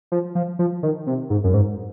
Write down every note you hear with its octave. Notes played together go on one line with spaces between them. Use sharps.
F3
F3
F3
D#3
C3
G#2
F#2
G#2